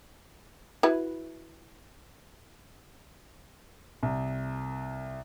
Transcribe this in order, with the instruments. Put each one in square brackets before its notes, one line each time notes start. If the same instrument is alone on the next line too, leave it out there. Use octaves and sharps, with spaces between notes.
[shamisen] E4 F#4 B4
[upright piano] C2